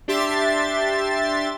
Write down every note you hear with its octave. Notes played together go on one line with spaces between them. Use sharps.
D4 G4 E5 C6 A6